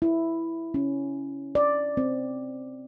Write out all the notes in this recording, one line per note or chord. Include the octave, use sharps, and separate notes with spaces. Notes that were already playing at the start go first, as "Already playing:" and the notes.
E4
C#4
D5
C4